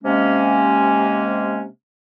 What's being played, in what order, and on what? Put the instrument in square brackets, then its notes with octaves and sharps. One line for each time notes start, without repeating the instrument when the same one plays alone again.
[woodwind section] C3 G#3 A#3 C#4